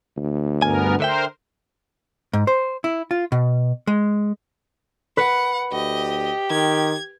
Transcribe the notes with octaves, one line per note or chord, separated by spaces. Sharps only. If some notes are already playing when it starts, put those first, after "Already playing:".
D2
G2 B3 A#4 G#5
D3 A#4 C5 E5 G5
G#2
C5
E4
F4
B2
G#3
B4 F#5
D2 G4 D#5
D#3 G#6